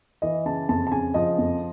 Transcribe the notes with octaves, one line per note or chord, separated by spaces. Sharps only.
E3 D#5
C#3 A5
F2 A5
A5
C#3 G#5
F3 D#5
F2